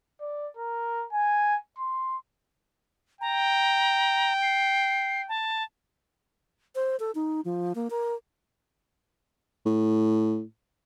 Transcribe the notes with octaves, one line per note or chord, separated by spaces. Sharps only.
D5
A#4
G#5
C6
G5 A#5
C7
A5
C5
A4
D#4
F3
A#3
A#4
A2